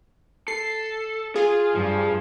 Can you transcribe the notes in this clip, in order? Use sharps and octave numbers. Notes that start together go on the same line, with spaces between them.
A4 C7
F4 G#4
G2 F3